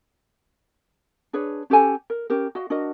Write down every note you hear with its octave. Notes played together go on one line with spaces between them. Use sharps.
D4 G#4 B4 C#5
C#4 G4 A4 G#5
A#4
C#4 G4 A#4
F#4 D#5 F5
D4 F#4 A#4 D#5